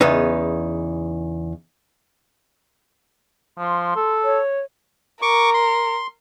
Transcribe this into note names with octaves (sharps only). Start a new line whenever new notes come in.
E2 C#3 B3 D#4
F3 C6
A4
C#5
A#4 C#6 D6
C6